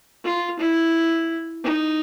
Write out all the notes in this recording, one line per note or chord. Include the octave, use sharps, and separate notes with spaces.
F4
E4
D#4